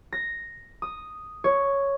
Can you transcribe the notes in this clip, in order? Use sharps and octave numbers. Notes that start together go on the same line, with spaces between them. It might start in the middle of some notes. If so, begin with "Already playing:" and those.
A#6
D#6
C#5